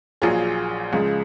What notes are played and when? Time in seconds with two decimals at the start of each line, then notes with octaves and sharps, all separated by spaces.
0.22 A#1 A#2 F#3 F4 G#4
0.93 C#2 C#3 F3 G#3